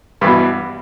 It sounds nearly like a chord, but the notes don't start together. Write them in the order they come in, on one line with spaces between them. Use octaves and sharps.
G2 E3 B2